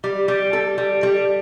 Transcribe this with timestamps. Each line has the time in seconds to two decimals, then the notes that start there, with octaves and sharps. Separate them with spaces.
0.04 G3
0.28 G3
0.53 A4
0.78 G3
1.03 G3